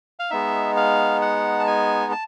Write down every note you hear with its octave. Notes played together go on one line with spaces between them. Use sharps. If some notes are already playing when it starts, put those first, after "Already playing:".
F5
G#3 B3 D#4 E5
F5
F#5
A5
G#5
A5